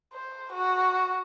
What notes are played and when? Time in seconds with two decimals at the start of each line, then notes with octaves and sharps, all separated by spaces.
0.13 C5
0.53 F#4